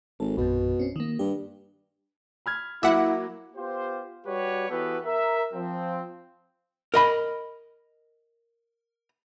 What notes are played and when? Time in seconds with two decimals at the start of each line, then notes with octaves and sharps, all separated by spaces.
0.20 G#1 A4
0.37 A#1 F#2 B2
0.79 C4 C#4
0.96 D#3 A#3
1.19 G2 G4
2.46 B5 F6 G#6
2.83 F#3 A#3 E4 E5 F#5 D6
3.56 B3 F4 G4 C5
4.26 G3 F#4 G4 B4 C#5
4.70 E3 B3 F#4 G4 A4 B4
5.05 A#4 E5
5.54 F3 C4
6.94 A#4 D#5 B5